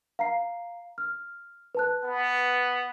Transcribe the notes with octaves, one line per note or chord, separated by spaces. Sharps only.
F5 A#5 C7
F6
B4 A5 F#6
B3